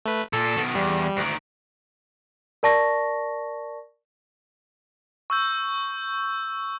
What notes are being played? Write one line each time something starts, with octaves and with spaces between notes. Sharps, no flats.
A3 B4
A#2 A4 E6
B2 D#3
E2 G3
D2 D#3
A#4 D5 A5 C#6 A#6
C#6 E6 G6